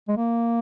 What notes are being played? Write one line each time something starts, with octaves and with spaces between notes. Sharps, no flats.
G#3
A#3